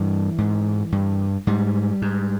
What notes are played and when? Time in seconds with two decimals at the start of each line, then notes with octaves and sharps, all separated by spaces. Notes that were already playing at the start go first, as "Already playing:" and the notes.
Already playing: G2 E3
0.38 G#2
0.92 G2
1.47 G#2 G3
2.02 G#2